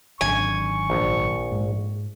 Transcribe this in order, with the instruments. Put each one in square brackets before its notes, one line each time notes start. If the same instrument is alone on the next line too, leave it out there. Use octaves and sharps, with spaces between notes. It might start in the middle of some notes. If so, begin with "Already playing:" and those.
[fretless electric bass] G#1 F#2 D3 [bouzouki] G#5 [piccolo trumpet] C#6
[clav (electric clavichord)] A#1
[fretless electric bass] G#2 G#3